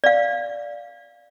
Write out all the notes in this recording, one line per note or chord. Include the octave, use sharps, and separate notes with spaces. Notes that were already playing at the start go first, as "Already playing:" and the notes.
D5 F5